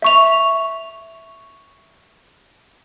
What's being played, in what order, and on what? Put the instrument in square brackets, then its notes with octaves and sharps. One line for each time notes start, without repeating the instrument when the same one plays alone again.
[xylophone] E5 C#6 F7